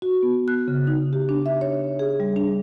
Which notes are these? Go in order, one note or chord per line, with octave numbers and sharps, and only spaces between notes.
F#4
B3
F#6
C#3
D#4
G4
D4
E5
C#5
G#4
G3
D4